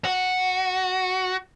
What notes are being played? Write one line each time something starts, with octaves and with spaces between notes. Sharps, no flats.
F#4